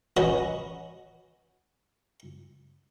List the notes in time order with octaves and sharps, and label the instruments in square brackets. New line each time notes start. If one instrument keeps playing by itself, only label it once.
[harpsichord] C#4 F#4 B4 D#5